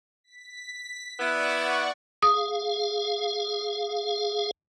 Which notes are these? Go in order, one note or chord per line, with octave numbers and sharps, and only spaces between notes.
B6
B3 E4 D5 F#5 C#6
G#4 F5 D#6